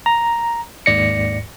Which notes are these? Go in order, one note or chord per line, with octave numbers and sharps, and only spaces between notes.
A#5
G#1 D#2 G#2 D5 A#6 C#7